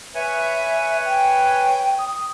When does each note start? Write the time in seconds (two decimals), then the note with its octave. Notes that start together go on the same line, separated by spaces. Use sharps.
0.15 B4 C#5 E5 G#5
1.05 G5
1.99 D#6